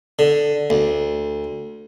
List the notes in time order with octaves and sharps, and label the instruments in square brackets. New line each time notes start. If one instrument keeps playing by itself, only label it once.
[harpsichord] D3
D2